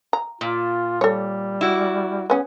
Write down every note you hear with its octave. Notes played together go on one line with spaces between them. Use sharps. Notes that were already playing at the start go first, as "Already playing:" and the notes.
A#5
A#2 F4
G3 A4 C#5
E4 F#4 D5
B3 C#4 G#4